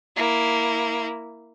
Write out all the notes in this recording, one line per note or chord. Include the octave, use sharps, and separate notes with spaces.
A#3 E4